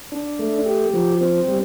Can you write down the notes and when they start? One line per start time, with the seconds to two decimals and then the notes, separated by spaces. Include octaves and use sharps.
0.12 D4
0.39 A3
0.66 G4
0.94 F3
1.21 C4
1.48 G3